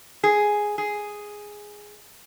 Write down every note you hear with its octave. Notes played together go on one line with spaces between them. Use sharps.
G#4
G#4